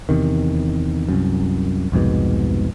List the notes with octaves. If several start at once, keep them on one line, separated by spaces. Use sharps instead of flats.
E2 C3 D#3
C2 F#2
C2 F2 G#2 B2